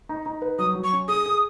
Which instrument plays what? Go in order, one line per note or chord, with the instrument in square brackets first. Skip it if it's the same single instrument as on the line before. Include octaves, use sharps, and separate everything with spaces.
[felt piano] D#4
D#4
B4
[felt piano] F#3 [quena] D#6
[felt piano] F#3
[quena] C#6
[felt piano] C#4
[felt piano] G#4 [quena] D#6
[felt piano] G#4